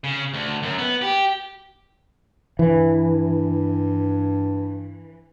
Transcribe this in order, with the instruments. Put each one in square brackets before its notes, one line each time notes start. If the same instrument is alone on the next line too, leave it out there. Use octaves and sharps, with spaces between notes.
[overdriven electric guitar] C#3
D2
F#2
B3
G4
[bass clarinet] G2 [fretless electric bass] E3